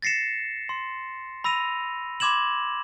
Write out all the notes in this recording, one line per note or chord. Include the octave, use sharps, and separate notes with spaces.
A6 A#6 C7 C#7 E7
C6
B5 E6 A#6 D#7 F7
B5 C6 D6 G#6 E7 F#7